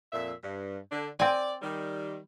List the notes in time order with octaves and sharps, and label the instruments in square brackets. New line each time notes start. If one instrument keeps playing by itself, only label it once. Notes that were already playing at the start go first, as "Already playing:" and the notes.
[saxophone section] F2 A#2 E5
G2
D3 D4
[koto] C4 G#5 [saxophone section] D5
[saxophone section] D#3 G3